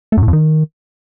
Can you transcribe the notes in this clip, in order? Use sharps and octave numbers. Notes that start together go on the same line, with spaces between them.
A3
F#2
A2
F2
D#3